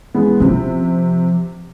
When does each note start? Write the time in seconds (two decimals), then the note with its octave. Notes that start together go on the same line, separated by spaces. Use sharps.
0.14 E3 G#3 B3
0.40 C3 F3